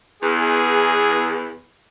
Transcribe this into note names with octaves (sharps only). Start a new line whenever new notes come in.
E2 G#4